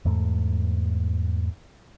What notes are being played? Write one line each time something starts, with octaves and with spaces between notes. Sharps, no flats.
E2 G#2 A3